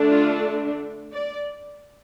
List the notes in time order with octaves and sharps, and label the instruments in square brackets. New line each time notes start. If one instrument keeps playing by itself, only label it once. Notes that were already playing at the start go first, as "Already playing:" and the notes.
Already playing: [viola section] D3 A3 D4
F4
D5